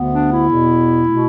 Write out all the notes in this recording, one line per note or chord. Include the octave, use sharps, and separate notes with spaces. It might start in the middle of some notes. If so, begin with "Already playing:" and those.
Already playing: D2 D3 B3
D4
E4
E2 B2 B3
B2 A3